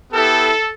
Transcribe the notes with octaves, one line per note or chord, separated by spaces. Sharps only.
B3 E4 G4 A4